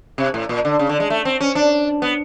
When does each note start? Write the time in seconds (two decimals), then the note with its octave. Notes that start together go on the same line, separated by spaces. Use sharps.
0.18 C3
0.34 A2
0.49 A#2
0.65 D3
0.79 C#3
0.89 D3
1.00 G#3
1.10 A3
1.25 C4
1.41 C#4
1.55 D4
2.02 B3